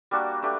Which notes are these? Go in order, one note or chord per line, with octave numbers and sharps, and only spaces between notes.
G3 A#3 D4 F#4
A3 D4 G4 B4